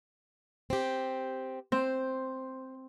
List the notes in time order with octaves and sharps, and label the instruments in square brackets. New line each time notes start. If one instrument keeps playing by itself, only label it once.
[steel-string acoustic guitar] C4 G4
[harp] C4 [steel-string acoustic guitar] C5